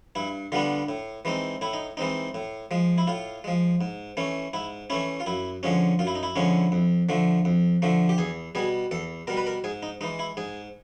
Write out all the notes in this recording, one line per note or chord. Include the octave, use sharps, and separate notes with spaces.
G2 E4
D3 G3 B3 D4 F4
A2
E3 G#3 C4 D#4
A2 E4
D#4
E3 G#3 C4 D#4
A2
F3 G#3
E4
A2 F4
F3 G#3
G#2
E3 A3 C#4
G#2 E4
E3 A3 C#4 E4
F4
F#2 E4
D3 F3 G#3 C#4
F#2 F4
E4
D#4
E4
D3 F3 G#3 C#4
F2
D3 F3 A3
F2
D3 F3 A3
G4
E2 G#4
B2 G3 G#4
E2 A4
B2 G3 A#4
B4
A#4
G#2 G#4
D#4
E3 G#3 D#4
E4
G#2 G#4